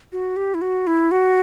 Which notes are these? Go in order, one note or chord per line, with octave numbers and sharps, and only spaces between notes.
F#4
G4
E4
F#4
E4
F#4